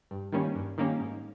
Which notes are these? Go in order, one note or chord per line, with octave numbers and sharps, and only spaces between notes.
G2
D#3 G3 A#3 C#4
G2
D#3 G3 A#3 C#4
G#2